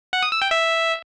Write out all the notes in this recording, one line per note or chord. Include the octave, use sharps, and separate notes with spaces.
F#5
D#6
E6
G5
E5